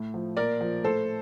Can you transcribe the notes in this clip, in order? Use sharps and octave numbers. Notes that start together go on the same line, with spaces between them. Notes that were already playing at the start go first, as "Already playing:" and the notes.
Already playing: A2
F3
A#2 A#4 D5
F3
A2 A4 C5